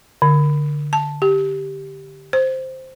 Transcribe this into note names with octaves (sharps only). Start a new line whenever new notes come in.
D3
A5
G4
C5